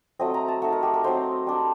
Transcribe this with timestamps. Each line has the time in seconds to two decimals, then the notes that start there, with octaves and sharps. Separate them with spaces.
0.19 F#3 A3 C4 D#5
0.34 A#5
0.48 A5
0.62 A3 D#4 F#5
0.72 A#4
0.83 G4
0.94 A#4
1.04 F#3 C4 D#4 C5
1.47 G3 D4